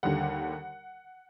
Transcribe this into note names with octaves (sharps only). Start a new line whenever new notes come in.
D#2 D3 G3 F#5